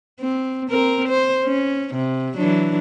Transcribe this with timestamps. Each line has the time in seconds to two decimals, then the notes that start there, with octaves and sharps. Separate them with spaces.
0.21 C4
0.70 C4 A#4
1.08 C5
1.44 C#4
1.95 C3
2.36 E3 F#3 D4